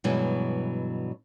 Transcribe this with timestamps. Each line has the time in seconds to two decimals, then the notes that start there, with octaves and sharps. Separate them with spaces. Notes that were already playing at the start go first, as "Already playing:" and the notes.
0.04 G2 B2 E3 F#3 G#3 B3